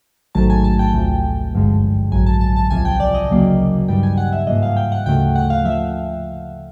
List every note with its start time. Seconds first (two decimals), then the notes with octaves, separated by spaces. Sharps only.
0.35 A1 G#2 D#3 F#3 A3 A5
0.50 G#5
0.64 A5
0.79 G5
0.94 D2 C3 F3
1.53 G1 G2 D3 F3 G#3
2.12 A#1 A2 F#3 G#5
2.26 A5
2.41 A5
2.56 A5
2.71 C#2 C3 F3 G#5
2.85 G5
3.00 D5
3.15 D#5
3.29 D2 C#3 F#3 A#3
3.89 G2 D#3 G3 G5
4.03 G#5
4.18 F#5
4.32 E5
4.47 G#2 F3 A#3 D#5
4.63 F5
4.77 G5
4.92 F#5
5.06 D2 C#3 F3 A3 G5
5.36 F#5
5.50 F5
5.64 F3 E5